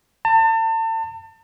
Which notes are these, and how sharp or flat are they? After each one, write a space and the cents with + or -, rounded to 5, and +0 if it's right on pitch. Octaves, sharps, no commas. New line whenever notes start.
A5 +35